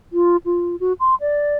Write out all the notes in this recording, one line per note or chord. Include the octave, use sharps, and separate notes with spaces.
F4
F4
F#4
C6
D5